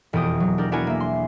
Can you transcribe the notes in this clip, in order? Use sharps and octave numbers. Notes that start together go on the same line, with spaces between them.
E1 F2 G4 D#6 D7
F#3
D4 G4 A#4
B3 D4 E4 F#4 A#4 G#5
A#3 E5
C6